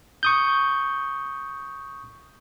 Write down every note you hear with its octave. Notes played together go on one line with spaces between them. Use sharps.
C#6 D#6 G6